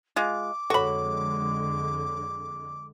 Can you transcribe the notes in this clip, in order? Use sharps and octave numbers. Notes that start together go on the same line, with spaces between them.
G#3 F4 D6
F2 D3 G#3 F#4 A4 C#5 B5